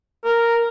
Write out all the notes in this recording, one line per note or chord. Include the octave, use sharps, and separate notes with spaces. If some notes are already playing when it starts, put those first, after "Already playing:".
A#4